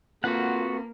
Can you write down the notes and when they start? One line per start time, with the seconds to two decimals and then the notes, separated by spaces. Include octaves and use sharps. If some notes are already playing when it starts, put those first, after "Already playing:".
0.24 A#3 C4 F4 F#4 A4 B4 F#5